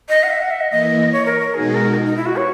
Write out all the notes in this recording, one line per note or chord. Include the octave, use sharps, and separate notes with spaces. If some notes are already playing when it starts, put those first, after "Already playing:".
D#5
F#5
E5
F#5
E5
D#5
E3 A#3 E4 D#5
C#5
A#4
A#4
B2 G#3 D#4 F#4 G#4
A#4
D#4
D#4
E4
F#4
C#5